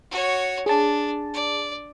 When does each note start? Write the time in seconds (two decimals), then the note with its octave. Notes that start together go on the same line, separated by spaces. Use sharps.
0.11 F#4 C#5
0.66 D4 G#4 A5
1.34 D5